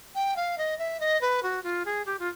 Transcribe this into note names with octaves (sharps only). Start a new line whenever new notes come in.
G5
F5
D#5
E5
D#5
B4
F#4
F4
G#4
G4
F4